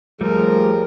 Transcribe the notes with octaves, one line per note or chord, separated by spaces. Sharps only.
D#2 F3 G3 A3 G#4 A#4